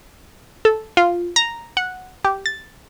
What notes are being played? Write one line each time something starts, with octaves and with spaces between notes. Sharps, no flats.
A4
F4
A#5
F#5
G4
A6